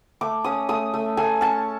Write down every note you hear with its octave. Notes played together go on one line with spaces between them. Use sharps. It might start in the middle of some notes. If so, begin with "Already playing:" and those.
A3 D6
C#4 D#6
A3 D#6
A3
A3 G#5
C#4 A5